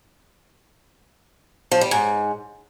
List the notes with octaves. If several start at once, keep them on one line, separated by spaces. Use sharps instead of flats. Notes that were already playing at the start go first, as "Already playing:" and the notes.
F3
G3
G#2